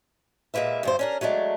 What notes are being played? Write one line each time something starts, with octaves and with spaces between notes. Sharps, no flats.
A#2 G#3 A#3 B4 E5
D2 G2 C5
C#4 D4 A#4
F#3 G#3 A3 D4